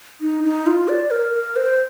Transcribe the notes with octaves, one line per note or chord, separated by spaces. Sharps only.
D#4
D#4
F4
D5
A#4
A#4
C5